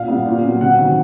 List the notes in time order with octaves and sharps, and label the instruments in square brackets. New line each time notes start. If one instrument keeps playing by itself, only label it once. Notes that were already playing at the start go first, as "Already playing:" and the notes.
Already playing: [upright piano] A#2 F5
G3 B3
A#2
F#3 B3
C3 F#5
D#3 F#3